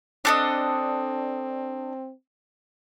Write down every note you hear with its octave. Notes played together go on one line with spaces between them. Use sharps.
C4 D4 A4 D#5